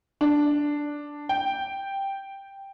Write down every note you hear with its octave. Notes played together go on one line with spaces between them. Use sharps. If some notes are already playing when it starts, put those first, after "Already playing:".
D4
G5